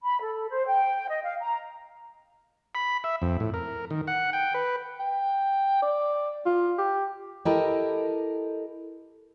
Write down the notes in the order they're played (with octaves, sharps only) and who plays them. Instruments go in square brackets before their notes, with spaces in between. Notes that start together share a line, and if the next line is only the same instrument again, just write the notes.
[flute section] B5
A4
C5
G5
D#5
F5
A#5
[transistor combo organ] B5
E5
F2
A2
A#4
D#3
F#5
G5
B4
[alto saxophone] G5
D5
F4
G4
[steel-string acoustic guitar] E4 G4 A4 A#4 D#5